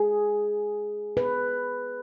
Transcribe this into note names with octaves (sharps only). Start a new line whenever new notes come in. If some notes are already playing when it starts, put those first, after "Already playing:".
Already playing: G#4
B4